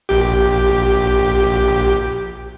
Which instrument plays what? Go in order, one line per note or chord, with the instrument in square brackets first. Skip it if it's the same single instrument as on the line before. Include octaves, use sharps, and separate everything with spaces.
[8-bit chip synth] A#1 G4